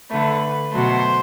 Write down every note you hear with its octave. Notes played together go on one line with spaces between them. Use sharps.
D3 A3 B4
B2 F#3 A3 C5